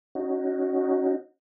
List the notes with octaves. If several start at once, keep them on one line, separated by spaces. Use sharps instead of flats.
C#4 D#4 F#4